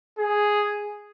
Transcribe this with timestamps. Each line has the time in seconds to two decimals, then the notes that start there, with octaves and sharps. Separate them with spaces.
0.18 G#4